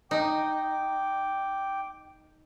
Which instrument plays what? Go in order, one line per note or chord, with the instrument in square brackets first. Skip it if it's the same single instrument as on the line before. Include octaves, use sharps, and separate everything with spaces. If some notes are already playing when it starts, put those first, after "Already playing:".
[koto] D#4 [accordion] G5 D6